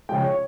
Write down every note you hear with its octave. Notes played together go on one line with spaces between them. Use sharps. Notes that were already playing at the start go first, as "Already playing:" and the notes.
C#3 F3 G#3 G5
C#5